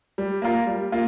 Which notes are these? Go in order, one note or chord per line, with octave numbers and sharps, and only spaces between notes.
G3
A#3 F4 A#4
G3
A#3 F4